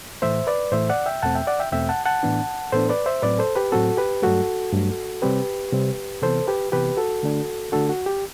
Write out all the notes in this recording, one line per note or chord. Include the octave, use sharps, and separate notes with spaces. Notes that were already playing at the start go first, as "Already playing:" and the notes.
A2 E3 A3 C5 E5
B4 D5
A2 E3 A3 C5 E5
D5 F#5
E5 G5
E2 B2 A3 C4 F#5 A5
E5 G5
D5 F#5
E5 G5
E2 B2 A3 C4 E5 G5
F#5 A5
F#5 A5
A2 E3 B3 D4
A2 E3 B3 D4 A4 C5
B4 D5
C5 E5
A2 F#3 C4 B4 D5
A4 C5
G4 B4
A2 F#3 C4 F#4 A4
G4 B4
G2 F#3 A3 F#4 A4
G2 F#3 A3
C3 G3 C4 G4 B4
C3 G3 C4
C3 E3 B3 A4 C5
G4 B4
C3 E3 B3 G4 B4
F#4 A4
D3 A3 D4
D3 A3 D4 F#4 A4
F#4
G4